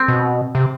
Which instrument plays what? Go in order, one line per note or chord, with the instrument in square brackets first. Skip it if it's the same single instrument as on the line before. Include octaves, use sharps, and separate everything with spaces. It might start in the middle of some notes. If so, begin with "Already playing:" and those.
Already playing: [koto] C4
[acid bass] B2
C3